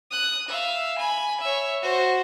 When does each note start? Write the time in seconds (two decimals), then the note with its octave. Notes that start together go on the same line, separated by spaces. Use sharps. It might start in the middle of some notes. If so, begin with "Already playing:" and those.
0.11 D#6 F#6
0.48 E5 F5
0.98 G#5 B5
1.41 C#5 E5
1.82 F#4 C5